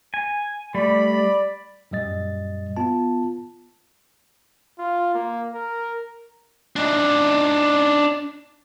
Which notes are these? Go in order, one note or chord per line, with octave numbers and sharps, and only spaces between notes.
G#5
G3 A3 D5 B5
D5
F#2 A#2 G3 D#5 A6
B3 F4 A5
F4
A#3
A#4
D4 D#4